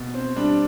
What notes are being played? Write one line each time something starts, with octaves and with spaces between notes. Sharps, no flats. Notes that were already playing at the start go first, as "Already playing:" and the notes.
Already playing: B2
C4
G3 D4